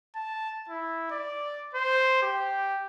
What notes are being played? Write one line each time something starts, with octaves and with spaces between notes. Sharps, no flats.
A5
E4
D5
C5
G4